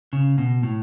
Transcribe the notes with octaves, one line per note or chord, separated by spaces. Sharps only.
C#3
B2
A2